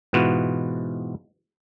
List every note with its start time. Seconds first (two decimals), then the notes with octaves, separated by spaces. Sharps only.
0.13 G#2 B2 E3 B3 F4 F#4